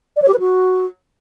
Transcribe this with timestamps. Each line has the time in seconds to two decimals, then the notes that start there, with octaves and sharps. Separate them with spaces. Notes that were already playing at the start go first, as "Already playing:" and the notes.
0.16 D5
0.22 C#5
0.28 G4
0.34 B4
0.39 F#4